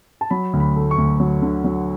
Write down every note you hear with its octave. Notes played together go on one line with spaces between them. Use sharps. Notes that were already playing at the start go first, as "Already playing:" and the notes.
A5
F#3 B5
D2
B5
A3
C#6
D2
F#3
D3
F#3